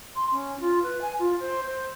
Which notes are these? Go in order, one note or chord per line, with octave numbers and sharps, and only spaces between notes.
C6
C#4
F4
B4
G#5
F4
C5
C5